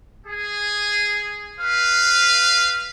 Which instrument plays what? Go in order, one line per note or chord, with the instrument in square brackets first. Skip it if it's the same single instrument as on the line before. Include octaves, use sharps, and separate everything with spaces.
[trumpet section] G#4
B4 F5